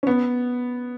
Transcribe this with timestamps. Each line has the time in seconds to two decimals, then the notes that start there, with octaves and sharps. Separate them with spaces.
0.03 C#4
0.07 B3